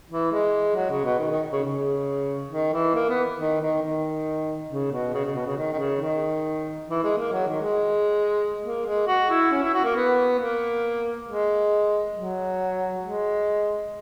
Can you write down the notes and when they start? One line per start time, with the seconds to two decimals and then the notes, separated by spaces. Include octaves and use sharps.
0.10 E3
0.32 G#3
0.75 F#3
0.90 C#3
1.05 B2
1.19 D#3
1.31 D#3
1.52 C#3
1.63 C#3
2.51 D#3
2.73 E3
2.94 A#3
3.09 B3
3.39 D#3
3.60 D#3
3.82 D#3
4.70 C#3
4.92 B2
5.13 C#3
5.25 C#3
5.35 B2
5.47 C#3
5.57 D#3
5.72 D#3
5.79 C#3
6.01 D#3
6.89 E3
7.04 G#3
7.18 A#3
7.32 F#3
7.47 D#3
7.62 G#3
8.64 A#3
8.86 G#3
9.07 F#4
9.30 E4
9.51 C#4
9.63 E4
9.74 F#4
9.84 A#3
9.95 B3
10.39 A#3
11.27 G#3
12.15 F#3
13.02 G#3